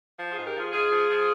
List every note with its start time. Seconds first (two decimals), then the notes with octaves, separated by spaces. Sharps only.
0.18 F3
0.31 G#2 F4 G#4
0.45 G4 A#4
0.54 F3 F4 G#4
0.72 G#2 F4 G#4
0.90 F3
1.08 F3